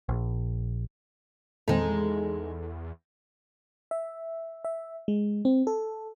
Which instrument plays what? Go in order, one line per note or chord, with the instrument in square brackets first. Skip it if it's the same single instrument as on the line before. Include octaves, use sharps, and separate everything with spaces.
[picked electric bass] A#1
[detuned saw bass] E2 [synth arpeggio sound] A#2 D#3 C4 [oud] G#3 D#4 [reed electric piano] A4
[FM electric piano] E5
E5
G#3
C4
A4